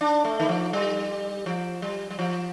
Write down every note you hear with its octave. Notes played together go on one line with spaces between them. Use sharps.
D4
A3
D#3
F3
G3
F3
G3
G3
F3